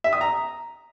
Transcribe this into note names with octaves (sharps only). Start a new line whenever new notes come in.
E5
D#6
A#5